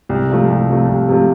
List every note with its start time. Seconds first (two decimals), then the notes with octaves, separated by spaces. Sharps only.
0.09 C2
0.30 C3 F3 A3
0.49 C2
0.69 C3 F3 A3
0.89 C2
1.09 C3 F3 A3